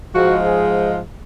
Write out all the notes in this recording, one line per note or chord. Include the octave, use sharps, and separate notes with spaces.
G#2 F3 G#3 F#4
G#4